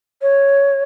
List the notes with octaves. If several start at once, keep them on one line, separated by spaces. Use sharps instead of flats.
C#5